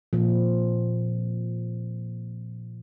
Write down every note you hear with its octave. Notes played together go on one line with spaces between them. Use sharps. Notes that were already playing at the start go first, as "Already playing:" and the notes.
A#2 F3